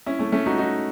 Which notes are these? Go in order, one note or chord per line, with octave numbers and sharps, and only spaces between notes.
C#4 E4
A3 C#4
A3 C#4
D#4 F#4
D#4 F#4